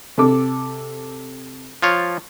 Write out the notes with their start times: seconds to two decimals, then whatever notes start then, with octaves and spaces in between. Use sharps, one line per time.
0.18 C3 A4 D6
1.82 F3 F4 C#5